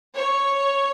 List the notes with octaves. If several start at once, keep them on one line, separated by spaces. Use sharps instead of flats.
C#5